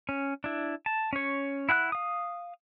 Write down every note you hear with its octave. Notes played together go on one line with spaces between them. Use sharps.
C#4
D4 E4
A5
C#4 C#5
E4 F#5 G5 F#6
F5 D#6